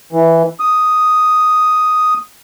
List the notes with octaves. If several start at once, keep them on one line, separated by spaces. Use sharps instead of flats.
E3
D#6